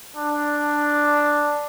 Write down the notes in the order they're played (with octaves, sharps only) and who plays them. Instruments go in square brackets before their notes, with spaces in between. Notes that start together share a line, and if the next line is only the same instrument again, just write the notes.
[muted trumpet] D4